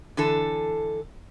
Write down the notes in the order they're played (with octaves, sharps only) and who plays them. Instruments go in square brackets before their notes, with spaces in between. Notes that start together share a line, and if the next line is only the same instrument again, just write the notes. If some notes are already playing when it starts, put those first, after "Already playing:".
[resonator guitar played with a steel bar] D3 E3 A4